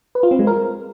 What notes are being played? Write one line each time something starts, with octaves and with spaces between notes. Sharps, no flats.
B4
F4
C4
G#3
A#4